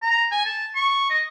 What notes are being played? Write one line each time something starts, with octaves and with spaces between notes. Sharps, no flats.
A#5
G#5
A5
C#6
D#5